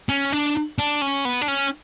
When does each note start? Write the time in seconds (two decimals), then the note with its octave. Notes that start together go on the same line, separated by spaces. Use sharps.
0.09 C#4
0.32 D4
0.79 D4
1.02 C#4
1.25 B3
1.42 D4
1.48 C#4